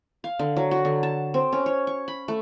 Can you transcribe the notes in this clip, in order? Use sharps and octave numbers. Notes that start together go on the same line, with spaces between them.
F5
D3
F#3
F#4
D3
A5
C4
C#4
C#5
C#6
B5
A3